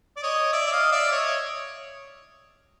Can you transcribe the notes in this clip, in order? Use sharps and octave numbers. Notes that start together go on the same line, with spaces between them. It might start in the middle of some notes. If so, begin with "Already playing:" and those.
D5
C#5 D#5
D5 E5
E5
D#5 F5
D5 E5
C#5 D#5